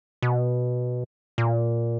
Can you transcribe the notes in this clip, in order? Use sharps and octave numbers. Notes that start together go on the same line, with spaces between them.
B2
A#2